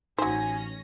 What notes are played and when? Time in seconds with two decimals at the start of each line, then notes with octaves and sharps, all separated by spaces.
0.18 A1 F#3 C#4 D#4 C5 G#5 A#6